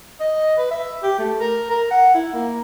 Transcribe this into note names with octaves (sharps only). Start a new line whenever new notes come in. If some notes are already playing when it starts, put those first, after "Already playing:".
D#5
B4
E5
G4
A3
A#4
A#4
F#5
E4
A#3